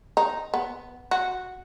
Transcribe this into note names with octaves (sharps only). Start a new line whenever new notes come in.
D#4
B3
F#4